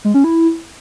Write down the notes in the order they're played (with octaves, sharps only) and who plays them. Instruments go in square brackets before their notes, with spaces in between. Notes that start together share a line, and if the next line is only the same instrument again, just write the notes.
[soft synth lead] G#3
C#4
E4